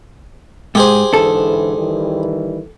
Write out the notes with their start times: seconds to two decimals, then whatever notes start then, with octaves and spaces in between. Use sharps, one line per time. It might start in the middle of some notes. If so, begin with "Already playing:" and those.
0.75 G#2 G4 G#4 C5
1.13 G#2 D3 E3 A4
1.77 D#3 E3 G3